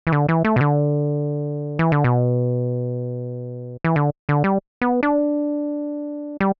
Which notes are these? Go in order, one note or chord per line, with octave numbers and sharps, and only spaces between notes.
E3
D3
E3
A3
B2
D3
E3
D3
B2
E3
D3
D3
G3
B3
D4
G3